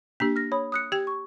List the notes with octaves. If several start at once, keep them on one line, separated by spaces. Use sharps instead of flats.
A#3 D4 G4 B6
F6 A#6
C#5 B5 D#6
D#6 F#6 C#7
G4 G5 G#6
C#6